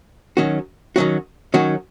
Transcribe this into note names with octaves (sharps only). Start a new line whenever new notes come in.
D#3 F#3 C#4 F#4
D#3 F#3 C#4 F#4
D#3 F#3 C#4 F#4